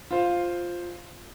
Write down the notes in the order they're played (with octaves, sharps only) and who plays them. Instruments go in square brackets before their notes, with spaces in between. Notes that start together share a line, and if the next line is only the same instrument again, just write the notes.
[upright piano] F4 C5 F5